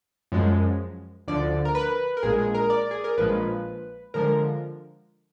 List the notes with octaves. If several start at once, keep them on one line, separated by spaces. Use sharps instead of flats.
F#2 F3 G#3
D2 D3 F3 D5
A#4
B4
A#4
A#1 A#2 G#3 G#4
G#4
A#4
D5
G#4
A#4
A#1 A#2 F3 G#3 B4
D3 F3 G#3 A#4